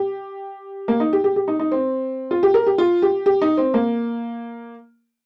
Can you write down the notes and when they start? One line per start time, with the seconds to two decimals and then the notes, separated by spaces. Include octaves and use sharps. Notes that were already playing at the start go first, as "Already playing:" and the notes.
Already playing: G4
0.88 A#3
1.00 D#4
1.13 G4
1.24 G4
1.36 G4
1.48 D#4
1.59 D#4
1.72 C4
2.31 F4
2.43 G4
2.54 A#4
2.67 G4
2.78 F4
3.02 G4
3.26 G4
3.42 D#4
3.57 C4
3.74 A#3